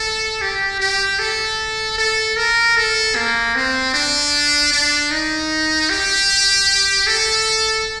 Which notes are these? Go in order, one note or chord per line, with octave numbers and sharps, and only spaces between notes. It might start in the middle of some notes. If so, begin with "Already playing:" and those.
Already playing: A4
G4
G4
A4
A4
A#4
A4
A#3
C4
D4
D4
D#4
G4
A4